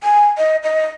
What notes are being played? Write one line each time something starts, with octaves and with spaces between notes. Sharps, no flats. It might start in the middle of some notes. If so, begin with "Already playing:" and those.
G#5
D#5
D#5